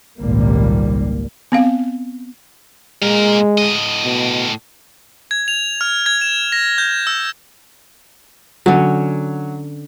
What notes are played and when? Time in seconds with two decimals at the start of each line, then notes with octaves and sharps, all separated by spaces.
0.19 G#1 C#2 A#2 G3 A#3
1.52 B3 C4 F5
3.02 A#2 G#3 A#4
3.58 A2 D#5
4.04 B2
5.31 G#6
5.48 F7
5.81 F6
6.06 G#6
6.21 E7
6.52 A#6
6.78 G6
7.07 E6
8.66 D3 F#3 C#4